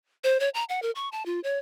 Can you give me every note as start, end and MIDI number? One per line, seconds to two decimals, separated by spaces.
0.24 0.40 72
0.40 0.49 73
0.54 0.64 82
0.69 0.80 78
0.82 0.91 70
0.95 1.09 85
1.12 1.25 81
1.26 1.40 65
1.44 1.58 73